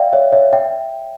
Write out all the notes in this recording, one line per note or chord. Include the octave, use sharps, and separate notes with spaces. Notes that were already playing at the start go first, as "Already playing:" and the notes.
Already playing: D5 E5 F5 G5
C#5 E5
C#5 E5
E5 G5